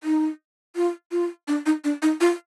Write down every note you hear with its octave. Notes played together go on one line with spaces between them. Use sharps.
D#4
F4
F4
D4
D#4
D4
D#4
F4